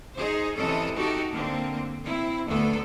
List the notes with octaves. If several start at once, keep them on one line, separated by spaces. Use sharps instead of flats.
D#4 G#4 C5
C3 E3 C#4 A4 D#5
D#4 F#4 G4 A4
D3 A#3 C4
C4 E4
D2 D3 A3 B3 A4